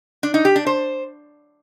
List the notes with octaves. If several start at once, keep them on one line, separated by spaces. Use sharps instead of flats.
D4
D#4
G4
D4
C5